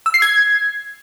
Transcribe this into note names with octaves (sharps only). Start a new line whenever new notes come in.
E6
C7
G#6